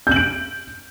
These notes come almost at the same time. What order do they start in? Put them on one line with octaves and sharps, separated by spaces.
G6 F#7 D7